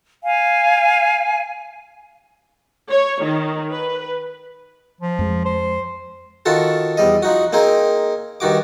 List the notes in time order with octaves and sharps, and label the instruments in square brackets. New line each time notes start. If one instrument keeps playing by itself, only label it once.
[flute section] F5 G#5
[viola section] C#5
D#3
B4
[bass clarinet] F3
[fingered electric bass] F2 G#3
[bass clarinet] C5
[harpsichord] D#3 F4 F#4 A4
E2 G3 D#5
F3 D#4 F#4
A#3 C4 D#4 G#4 A#4
G2 D#3 F#4 D6